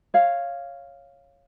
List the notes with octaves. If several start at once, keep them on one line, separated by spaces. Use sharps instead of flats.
C#5 F5